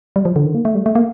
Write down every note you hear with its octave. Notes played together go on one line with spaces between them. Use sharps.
G3
F3
D3
D#3
A#3
A3
G3
A3
A#3